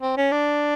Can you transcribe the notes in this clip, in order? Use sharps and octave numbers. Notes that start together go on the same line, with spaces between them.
C4
C#4
D4